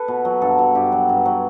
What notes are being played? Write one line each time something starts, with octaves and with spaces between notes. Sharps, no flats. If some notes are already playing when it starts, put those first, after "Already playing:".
Already playing: A4 B4
B2
F#3
G2 A4
F#3
G2 G4
F#3
G2
F#3